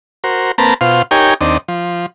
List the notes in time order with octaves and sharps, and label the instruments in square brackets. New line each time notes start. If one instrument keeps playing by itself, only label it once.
[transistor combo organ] F#4 A#4 C5
A#3 C4 B4 A5 A#5
B2 F4 C5 F5
D#4 G4 A#4 C#5 G5 G#5
D#2 C4 D4 D#5
F3